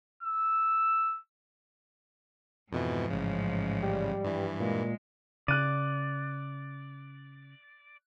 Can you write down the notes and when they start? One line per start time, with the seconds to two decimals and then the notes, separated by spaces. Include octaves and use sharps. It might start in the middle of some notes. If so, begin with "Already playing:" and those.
0.23 E6
2.72 F2 G#2 B2 E3 F3
3.10 A1 C#3
3.83 G3
4.25 G2 E3
4.60 A#2 G#3
5.48 C#3 D5 F#6 D#7